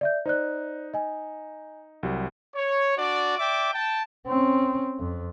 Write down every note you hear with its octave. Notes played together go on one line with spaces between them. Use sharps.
D5 E5 G6
D#4 C5 D5 F#6
D#5 G#5
C2 F#3 G3
C#5
D4 F#4 D5
D5 E5 G5 D6
G5 A5
C4 C#4
F2